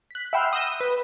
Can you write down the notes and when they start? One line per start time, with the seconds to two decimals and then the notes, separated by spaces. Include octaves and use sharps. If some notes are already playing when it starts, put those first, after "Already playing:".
0.11 F#6 B6
0.33 E5 F#5 G5 B5 C6 F6
0.53 D#6 E6 G6 A#6 D#7
0.80 B4